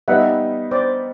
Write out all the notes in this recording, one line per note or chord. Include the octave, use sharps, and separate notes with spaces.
G3 B3 D#4 E5 F#5
C5 D5